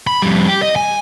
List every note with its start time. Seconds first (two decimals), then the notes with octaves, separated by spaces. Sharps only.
0.07 B5
0.22 F2 G3
0.48 G4
0.62 D#5
0.76 G#5